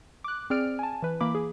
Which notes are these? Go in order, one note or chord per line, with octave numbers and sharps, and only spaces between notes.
D6 F#6
C4 G#4 D5 F6 D7
G#5 A5
E3 B4
E3 A#3 B5 D6
G#4